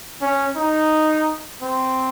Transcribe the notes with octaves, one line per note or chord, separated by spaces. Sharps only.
C#4
D#4
C4